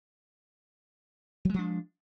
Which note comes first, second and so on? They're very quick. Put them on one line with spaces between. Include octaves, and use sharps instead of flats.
F#3 G#3 F3 D4